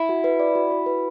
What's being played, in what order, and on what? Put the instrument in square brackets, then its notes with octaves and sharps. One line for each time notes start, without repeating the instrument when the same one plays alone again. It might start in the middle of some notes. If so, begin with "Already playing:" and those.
Already playing: [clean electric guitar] E4
[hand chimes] F#4
B4
D5
F#4
F#4
B4